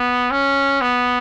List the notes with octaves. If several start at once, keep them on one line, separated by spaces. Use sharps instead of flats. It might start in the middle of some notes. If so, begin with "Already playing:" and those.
Already playing: B3
C#4
B3